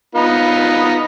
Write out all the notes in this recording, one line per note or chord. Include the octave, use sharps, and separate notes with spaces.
B3 D#4 F4